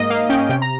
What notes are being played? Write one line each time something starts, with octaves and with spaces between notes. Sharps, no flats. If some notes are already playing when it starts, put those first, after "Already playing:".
Already playing: G#2 A#3 D#5
A#3 F5
C#4 G5
C3 G5
A#5